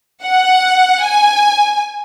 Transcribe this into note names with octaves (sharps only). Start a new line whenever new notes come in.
F#5
G#5